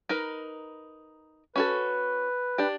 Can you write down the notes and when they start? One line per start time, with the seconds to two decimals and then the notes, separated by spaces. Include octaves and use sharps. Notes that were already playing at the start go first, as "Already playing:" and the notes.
0.09 D#4 A#4 B4
1.56 C#4 F#4 A4 B4
2.58 D4 G4